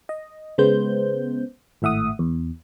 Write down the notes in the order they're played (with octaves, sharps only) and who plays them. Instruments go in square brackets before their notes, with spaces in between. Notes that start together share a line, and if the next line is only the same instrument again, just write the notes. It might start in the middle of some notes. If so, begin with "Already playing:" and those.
[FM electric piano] D#5
C#3 G#3 B3 C5 G6
G#1 A2 E5 F#5 D#6
E2